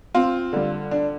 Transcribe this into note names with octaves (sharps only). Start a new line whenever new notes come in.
C4 F4
D3 G3
D4